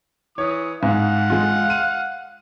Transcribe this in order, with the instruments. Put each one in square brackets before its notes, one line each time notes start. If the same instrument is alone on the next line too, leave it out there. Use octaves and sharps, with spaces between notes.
[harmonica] E3 D#6 [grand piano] C#5
[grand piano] G#2 [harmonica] F5 F#5
[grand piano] G#3 F4
D#7